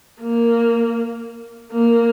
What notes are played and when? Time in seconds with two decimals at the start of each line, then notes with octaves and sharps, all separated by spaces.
0.21 A#3
1.72 A#3